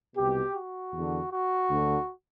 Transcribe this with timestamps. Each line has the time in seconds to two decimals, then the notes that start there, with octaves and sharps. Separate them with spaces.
0.16 C2 B2 G4
0.54 F#4
0.93 E2 D3
1.30 F#4
1.70 D2 D3